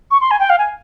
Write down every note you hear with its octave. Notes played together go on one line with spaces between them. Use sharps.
C#6
C6
G#5
G5
F5
G#5